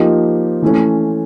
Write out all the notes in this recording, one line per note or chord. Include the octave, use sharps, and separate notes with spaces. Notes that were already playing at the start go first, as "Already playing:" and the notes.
Already playing: F3 A#3 D#4 G4
E3 A3 C#4